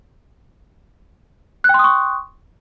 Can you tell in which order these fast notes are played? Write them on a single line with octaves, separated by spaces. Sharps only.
F#6 G5 C6 D#6 C#6